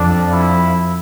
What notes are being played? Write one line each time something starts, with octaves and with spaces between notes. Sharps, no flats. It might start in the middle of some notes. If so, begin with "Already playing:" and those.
Already playing: F2 D4
E4